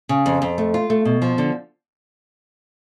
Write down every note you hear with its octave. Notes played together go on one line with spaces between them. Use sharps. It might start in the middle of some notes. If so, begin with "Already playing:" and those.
C#3
F2
F2
A3
F4
A3
B2
F3
D3